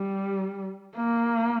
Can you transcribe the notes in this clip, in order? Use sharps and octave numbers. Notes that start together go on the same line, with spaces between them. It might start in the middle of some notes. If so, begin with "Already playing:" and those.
Already playing: G3
A#3